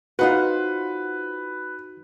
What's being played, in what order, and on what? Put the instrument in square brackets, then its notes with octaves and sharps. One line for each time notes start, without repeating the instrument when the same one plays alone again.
[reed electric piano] D#4 F#4 [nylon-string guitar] F4 C5 F#5 [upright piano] B4